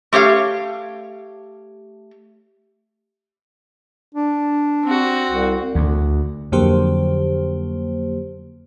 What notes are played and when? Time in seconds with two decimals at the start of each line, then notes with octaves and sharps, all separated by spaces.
0.13 A3 G4 C#5 F5
4.15 D4
4.84 C4 F#4
5.31 C2
5.75 D2
6.52 F2 D3 F#3 A#3 G4 C5